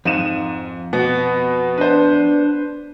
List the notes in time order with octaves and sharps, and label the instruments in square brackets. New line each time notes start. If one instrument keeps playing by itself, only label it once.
[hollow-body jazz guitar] F2 [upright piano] G#2 D#7 E7
[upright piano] B2 [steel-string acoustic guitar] B3
[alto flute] D4 [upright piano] B4 C5